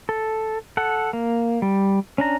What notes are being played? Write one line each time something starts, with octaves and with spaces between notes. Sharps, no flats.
A4
A4 F#5
A#3
G3
C#4 D4 A#5